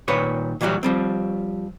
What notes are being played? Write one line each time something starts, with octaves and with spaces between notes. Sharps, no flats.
A#2 D#3 B4 C#5
A#2 E3 F#3 G3 F#4
F3 G3 C4